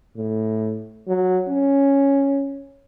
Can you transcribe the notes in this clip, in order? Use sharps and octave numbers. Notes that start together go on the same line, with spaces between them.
A2
F#3
C#4